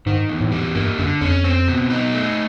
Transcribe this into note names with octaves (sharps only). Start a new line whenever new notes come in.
G#2 D#3
E2
A2
G3
G2 A#3
F#2 D3
F2 C#4
C4
B2
D#4
A3